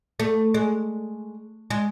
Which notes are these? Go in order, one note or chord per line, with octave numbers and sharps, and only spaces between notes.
A3
G#3
G#3